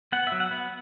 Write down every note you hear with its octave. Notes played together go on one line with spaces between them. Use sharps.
B3 F#5
F#3 E5
F#5
B3